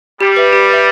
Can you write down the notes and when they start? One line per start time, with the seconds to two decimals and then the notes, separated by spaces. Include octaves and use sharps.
0.20 G3 G4
0.36 B4 E5
0.53 G4
0.69 B4 E5